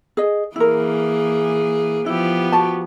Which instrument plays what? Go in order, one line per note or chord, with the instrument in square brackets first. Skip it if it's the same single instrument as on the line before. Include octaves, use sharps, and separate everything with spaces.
[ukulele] G#4 D#5
[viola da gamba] E3 A#3 G#4 [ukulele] E4 A#4
[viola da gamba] F3 B3 G4 [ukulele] E4
[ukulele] F#4 A5